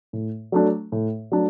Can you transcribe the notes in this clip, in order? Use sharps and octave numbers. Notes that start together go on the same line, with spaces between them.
A2
F#3 A3 D4
A2
F#3 A3 D4